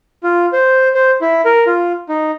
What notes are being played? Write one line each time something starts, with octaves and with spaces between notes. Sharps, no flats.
F4
C5
C5
E4
A#4
F4
D#4